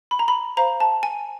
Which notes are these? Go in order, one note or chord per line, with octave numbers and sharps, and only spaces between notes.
B5
A#5
B5
C5 F5 A#5
A5
G#5